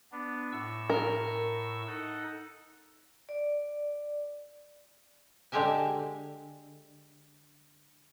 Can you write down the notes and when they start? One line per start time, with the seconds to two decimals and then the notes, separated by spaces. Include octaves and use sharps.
0.12 B3 D4
0.52 A2 C#6 E6
0.90 A#4
1.87 D#4 A4 F#5
3.29 D5
5.52 D3 G#3 G4 E5 G#5